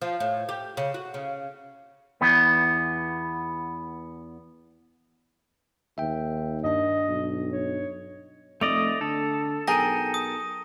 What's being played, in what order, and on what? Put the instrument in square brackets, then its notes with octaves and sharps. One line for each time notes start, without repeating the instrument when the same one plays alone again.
[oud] F3
A2
G4
C#3
F#4
C#3
[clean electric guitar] E2 B3
[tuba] D#2 [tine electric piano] E5 G5
[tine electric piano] G2 D4 [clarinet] D#5
[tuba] B1
[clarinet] C#5
[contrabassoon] F1 [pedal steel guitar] A3 D5 D#5 [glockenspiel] F7
[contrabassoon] D3 [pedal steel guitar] A4
[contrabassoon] B1 [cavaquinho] G#4 A#4 G5 [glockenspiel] A#6 D#7
[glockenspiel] D#6